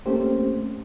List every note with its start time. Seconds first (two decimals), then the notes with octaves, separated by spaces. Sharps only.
0.06 A3 A#3 C4 C#4 G4 C5